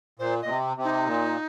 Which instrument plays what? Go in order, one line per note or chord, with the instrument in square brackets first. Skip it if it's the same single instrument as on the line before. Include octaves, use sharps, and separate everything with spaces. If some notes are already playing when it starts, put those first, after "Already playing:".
[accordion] A#2 [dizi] C5
[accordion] A#2 [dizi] D#5
[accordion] C3
C3
[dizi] D#4
[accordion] A#2